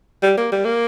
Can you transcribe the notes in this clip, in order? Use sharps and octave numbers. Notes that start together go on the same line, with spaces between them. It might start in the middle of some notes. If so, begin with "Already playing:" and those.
G3
A#3
G3
A#3